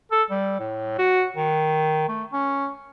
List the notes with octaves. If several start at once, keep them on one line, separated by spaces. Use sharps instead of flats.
A4
G3
A2
F#4
D#3
A3
C#4